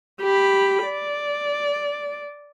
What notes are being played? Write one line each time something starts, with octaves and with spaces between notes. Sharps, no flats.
G4 B5
D5